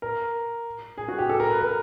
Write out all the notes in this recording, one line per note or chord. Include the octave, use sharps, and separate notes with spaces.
A#4
G#4
F#4
G4
A4
A#4
B4
A#4